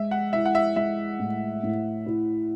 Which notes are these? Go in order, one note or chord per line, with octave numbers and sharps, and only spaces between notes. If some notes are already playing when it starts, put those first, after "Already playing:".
Already playing: G#3 E5
F#5
E4 E5
F#5
E5
G#3 E5
A2
A2
E4